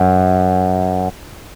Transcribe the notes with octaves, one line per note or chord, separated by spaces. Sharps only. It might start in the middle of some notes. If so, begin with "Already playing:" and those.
Already playing: F#2